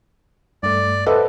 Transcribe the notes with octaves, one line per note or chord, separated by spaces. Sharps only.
G2 A3 D5
A4 B4 C5 D#5 E5 F#5